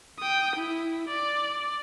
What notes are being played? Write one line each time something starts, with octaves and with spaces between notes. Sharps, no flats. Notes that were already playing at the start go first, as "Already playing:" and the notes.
G5 D#6
E4
D5